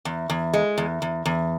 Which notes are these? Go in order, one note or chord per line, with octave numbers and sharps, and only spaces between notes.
E2
E2
G#3
E2
E2
E2